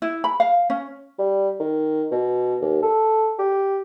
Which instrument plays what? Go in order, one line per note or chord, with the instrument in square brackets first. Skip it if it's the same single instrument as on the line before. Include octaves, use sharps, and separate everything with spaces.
[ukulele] E4
B5
F5
C#4
[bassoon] G3
D#3
B2
D#2
A4
G4